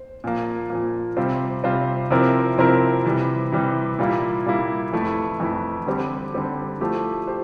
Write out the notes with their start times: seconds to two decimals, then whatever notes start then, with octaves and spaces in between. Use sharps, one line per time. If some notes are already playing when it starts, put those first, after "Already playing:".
Already playing: C5
0.24 A#2 F3 A#3
0.70 A#2 F3 A#3
1.17 C3 G3 C4 F4 C5
1.64 C3 G3 C4 F4 C5
2.10 C3 F3 C4 E4 A#4
2.58 C3 F3 C4 E4 A#4
3.05 C3 E3 G3
3.52 C3 E3 G3
3.99 A#2 G3 A#3 E4
4.46 A#2 G3 A#3 E4
4.93 F2 E3 A3 E4
5.40 F2 E3 A3 E4
5.87 D3 G3 C4 G4
6.34 D3 G3 C4 G4
6.80 F3 A3 E4 G4 C5
7.27 G4 C5